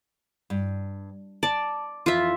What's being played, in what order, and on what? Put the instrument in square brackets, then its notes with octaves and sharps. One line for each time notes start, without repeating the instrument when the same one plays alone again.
[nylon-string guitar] G2
[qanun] D5 [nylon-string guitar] A5
[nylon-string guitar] F2 E3 [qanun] F4 E5